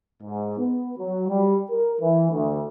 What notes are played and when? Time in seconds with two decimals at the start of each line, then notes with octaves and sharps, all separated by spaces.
0.22 G#2
0.58 B3
0.98 F#3
1.29 G3
1.70 A#4
2.00 E3
2.32 D2